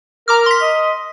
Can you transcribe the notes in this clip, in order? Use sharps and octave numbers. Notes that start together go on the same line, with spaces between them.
A#4 A#5 D6 F6
C6 B6
D#5